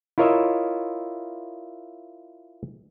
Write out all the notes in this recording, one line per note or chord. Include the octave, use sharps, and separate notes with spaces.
E4 F4 A#4 C#5 D#5 E5